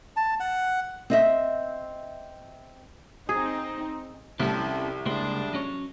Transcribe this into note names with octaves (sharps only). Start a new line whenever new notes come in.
A5
F#5
C4 D#5 E5
C4 D#4 G#4
C2 F3 C4 C#4 E4 G4 A4
C#2 G3 G#3 A#3 D4 C5
F#3 C#4 C#5